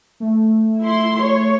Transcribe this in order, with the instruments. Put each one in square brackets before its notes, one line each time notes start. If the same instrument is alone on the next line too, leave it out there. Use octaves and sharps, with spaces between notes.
[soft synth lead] A3
[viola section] E4 C6
C#5